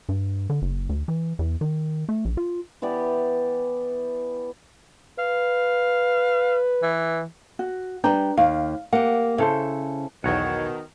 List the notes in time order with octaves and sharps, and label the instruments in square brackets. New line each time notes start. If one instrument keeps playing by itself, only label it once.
[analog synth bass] G2
D3
F#1
D2
E3
E2
D#3
A3
A#1
F4
[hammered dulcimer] E3 B3 G4 D5
[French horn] B4 [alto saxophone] F5
[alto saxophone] E3
[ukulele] F#4
[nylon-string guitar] G3 G5 [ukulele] D4 B4 A#5
[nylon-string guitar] D#2 [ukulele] F5
[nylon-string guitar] A#3 G4 [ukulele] F#5
[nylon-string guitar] C#3 [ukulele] E4 A4 C5
[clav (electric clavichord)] B1 E2 [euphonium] B2 [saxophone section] D#3 [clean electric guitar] F#4 C#5 F#5